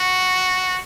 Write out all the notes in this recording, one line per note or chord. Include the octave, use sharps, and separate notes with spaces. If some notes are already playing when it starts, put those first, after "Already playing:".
Already playing: F#4